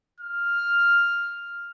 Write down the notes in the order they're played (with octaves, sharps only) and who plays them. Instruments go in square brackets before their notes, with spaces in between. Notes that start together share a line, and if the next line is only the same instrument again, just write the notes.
[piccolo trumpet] F6